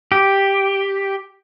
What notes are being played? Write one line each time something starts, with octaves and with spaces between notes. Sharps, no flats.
G4